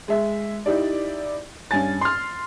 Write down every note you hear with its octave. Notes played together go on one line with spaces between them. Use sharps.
G#3 E5
D#4 E4 G4 D5
G2 C#4 G#5 A6
C6 F6